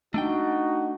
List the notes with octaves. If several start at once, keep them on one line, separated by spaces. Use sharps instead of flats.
A3 D4 D#4 F#4 G5